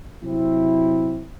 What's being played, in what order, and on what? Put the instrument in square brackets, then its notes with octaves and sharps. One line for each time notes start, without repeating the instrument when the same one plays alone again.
[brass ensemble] C3 F#3 C4 E4